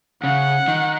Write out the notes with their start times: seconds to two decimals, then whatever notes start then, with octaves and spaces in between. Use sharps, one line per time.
0.23 C#3 F#5
0.68 D#3